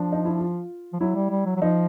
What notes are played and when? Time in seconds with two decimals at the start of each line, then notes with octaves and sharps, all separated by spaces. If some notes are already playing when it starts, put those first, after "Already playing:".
Already playing: F3 D4
0.12 D#4
0.25 E4
0.39 F4
0.93 F3
1.00 F#3 E4
1.15 G3
1.30 G3
1.46 F#3
1.56 F#3
1.61 F3 D#4